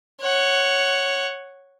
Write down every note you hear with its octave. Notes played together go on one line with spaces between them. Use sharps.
C#5 F#5